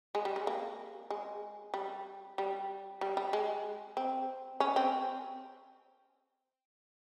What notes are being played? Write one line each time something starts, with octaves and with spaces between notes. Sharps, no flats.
G#3
G3
G#3
A#3
G#3
G3
G3
G3
G3
G#3
C4
C#4
C4